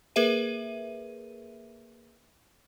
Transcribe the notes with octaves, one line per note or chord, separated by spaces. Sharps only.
A#3 G#4 A#4 B4 E5 D#7